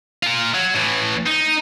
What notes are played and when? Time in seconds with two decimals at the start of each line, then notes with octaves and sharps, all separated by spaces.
0.23 F4 A#4
0.54 F#3
0.75 A2 E3
1.26 D#4